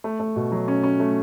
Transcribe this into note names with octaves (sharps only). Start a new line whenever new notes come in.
A3
A3
B2
F#3
C#4
C#4
A3